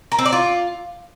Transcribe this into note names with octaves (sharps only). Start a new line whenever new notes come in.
A#4
C4
D5
F4